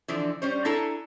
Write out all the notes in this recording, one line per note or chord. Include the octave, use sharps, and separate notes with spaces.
D3 E3 F3
G3 C#4 C5
D4 E4 A4 G#5 A#5